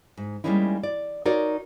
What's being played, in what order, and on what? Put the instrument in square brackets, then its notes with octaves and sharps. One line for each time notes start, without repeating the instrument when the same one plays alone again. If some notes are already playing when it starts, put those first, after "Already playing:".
[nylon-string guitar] G#2
G3 G#3 A#3 C#4 D#4 E4
D5
D#4 F#4 A#4 C#5 D5